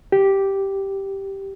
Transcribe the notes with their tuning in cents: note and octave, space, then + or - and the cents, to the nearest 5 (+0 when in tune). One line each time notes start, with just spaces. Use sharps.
G4 -5